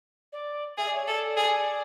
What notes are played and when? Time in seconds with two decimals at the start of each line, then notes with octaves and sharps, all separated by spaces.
0.32 D5
0.77 G#4 E5
0.87 D5
0.95 C#5
1.03 A4 D5
1.36 G#4